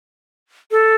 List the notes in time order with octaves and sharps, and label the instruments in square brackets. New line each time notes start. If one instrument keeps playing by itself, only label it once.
[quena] A4